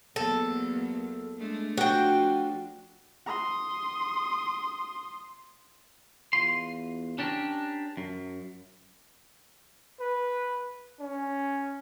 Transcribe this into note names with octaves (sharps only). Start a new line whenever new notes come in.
E2 F#3 A#3 A4
G#3 A3 D4
F3 D4 F#4 G5
C6 D#6
E2 F4 C6
C#4 D4 G4 A#4
F#2
B4
C#4